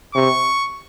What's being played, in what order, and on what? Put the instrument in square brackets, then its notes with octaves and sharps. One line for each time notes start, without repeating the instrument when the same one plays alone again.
[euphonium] C3 [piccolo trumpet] C#6